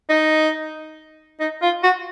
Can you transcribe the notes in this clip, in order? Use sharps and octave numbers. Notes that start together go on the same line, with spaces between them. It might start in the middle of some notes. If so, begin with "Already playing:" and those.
D#4
D#4
F4
F#4